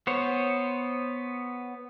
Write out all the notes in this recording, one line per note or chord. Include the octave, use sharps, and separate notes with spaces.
B3 C5 C#5